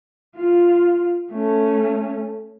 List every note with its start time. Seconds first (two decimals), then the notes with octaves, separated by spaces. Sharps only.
0.36 F4
1.31 A3 C#4